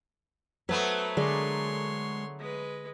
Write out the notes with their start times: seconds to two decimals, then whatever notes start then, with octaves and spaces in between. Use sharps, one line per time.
0.69 F#3 A3 B3 B4 C5 F#5
1.17 D3 G#3 G#4 A#4 C#5 D5 C6
2.39 G#3 B4